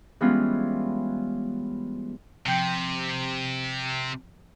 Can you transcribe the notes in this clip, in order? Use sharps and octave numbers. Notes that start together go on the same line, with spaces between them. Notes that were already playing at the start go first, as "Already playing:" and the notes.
E3 G3 G#3 B3 C#4 F4
C3 F3 G5 G6